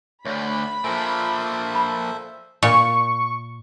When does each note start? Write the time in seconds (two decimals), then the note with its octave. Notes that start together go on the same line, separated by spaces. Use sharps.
0.25 D2 D3 C#5 B5
0.84 A#2 F3 A4 C5 E5 G#5
1.75 B5
2.63 A#2 C#6